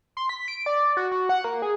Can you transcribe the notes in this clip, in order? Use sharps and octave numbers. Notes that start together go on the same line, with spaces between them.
C6
B6
D7
D5
F#4
F#4
F#5
A#3
G#4